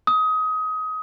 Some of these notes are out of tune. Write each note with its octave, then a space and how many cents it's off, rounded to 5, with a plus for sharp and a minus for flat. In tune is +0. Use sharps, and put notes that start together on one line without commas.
D#6 +20